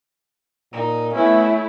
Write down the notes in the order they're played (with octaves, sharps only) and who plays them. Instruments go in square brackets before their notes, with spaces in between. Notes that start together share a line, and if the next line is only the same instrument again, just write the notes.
[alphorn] A#2 [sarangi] D#4
[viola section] A3 E4 [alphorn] B3 [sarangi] C#4